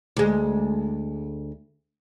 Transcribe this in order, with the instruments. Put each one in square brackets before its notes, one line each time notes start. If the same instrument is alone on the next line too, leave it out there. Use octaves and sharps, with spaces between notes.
[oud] D2 G#3